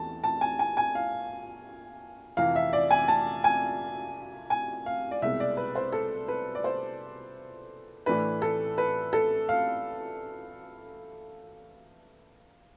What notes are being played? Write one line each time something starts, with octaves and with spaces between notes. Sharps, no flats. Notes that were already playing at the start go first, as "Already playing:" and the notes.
Already playing: E2 E3 A3 A5
A5
G#5
G#5
G#5
F5
F2 C3 E3 F5
E5
D5
G#5
A5
G#5
G#5
F5
D5
C2 B2 G#3 C4 E5
D5
B4
C5
A4
B4
D5
C5
A2 E3 A3 D4 B4
A4
B4
A4
F5